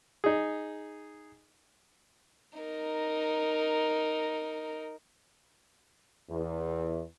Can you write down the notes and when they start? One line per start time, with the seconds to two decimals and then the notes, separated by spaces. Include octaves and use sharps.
0.24 D#4 G#4
2.59 D#4 A#4
6.30 E2